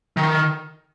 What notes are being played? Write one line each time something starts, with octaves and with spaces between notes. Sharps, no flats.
D#3